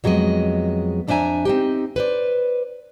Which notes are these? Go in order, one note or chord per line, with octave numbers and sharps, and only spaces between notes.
F2 F#3 G#3 B3 D#5
F2 D4 C5 E5 G#5 A#5
C4 D#4 G4
B4 C5 D5